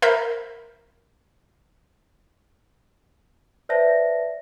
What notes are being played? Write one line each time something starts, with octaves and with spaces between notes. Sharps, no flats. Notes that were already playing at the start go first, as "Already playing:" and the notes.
A#4 C5 E5 B5 G6
B4 C5 D5 E5 A5 A#6